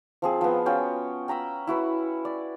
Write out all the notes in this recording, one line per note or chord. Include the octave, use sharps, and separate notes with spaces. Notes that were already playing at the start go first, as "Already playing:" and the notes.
F3 C4 G#4
F3 B3
C#4 F4 F#4 G5
G5 A#5 B5 E6
E4 F#4 B4
D5